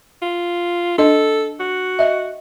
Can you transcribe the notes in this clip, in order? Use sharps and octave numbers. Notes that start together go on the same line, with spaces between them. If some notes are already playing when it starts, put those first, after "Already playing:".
F4
D4 A4 D#5
F#4
D#5 E5